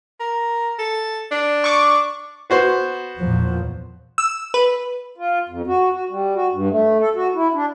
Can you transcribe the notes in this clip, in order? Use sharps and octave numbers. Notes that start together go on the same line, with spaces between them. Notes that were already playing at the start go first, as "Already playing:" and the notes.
A#4
A4
D4
C#6 D6
B3 F#4 C5
E2 A#2 F3
E6
B4
F4
F2
F#4
F#4
G3
F#4
G2
A3
A4
F#4
E4
D4